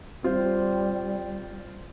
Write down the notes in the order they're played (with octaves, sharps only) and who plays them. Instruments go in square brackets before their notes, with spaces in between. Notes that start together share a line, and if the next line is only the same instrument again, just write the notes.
[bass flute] G3 [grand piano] C4 F4 C5